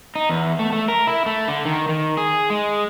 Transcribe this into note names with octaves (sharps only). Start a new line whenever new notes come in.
D#4
E2
A3
A3
A#4
E4
A3
D3
D#3
D#3
G#4
G#3